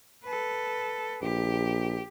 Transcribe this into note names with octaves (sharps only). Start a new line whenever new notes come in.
A4 B4
A#1 G4